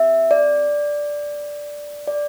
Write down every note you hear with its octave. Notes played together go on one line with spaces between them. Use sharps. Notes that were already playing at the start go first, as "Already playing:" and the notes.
Already playing: C4 G4 E5
D5
D5